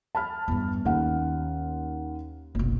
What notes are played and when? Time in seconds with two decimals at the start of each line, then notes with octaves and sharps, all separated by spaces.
0.15 A5 B5 F6
0.48 E2 G2
0.85 D#2 C#4 F#5
2.55 F#1 B1